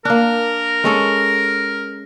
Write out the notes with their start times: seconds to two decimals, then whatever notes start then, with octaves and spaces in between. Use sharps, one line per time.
0.05 A#3 D4 A#4
0.84 G#3 C#4 A4